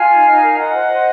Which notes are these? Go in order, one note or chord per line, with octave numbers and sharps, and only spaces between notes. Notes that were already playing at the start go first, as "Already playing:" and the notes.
Already playing: F4 F5 G#5
D#4
D#4
A#4
F4 D#5 F#5
C5
C5